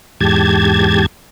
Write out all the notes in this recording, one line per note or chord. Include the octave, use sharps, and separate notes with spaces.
E2 G#2 G4 A5 G#6